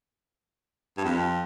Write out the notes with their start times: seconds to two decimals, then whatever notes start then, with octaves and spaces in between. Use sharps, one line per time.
0.97 G2
1.04 F2